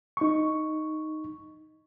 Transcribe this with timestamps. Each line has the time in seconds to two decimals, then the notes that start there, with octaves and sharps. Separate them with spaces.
0.17 D#4 C#6